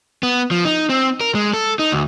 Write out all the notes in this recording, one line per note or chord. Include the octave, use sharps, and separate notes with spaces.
B3
F3
D#4
C4
A#4
G#3
A4
D#4
D2